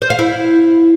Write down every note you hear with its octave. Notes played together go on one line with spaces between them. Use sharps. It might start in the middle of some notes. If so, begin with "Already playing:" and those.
C5
F5
E4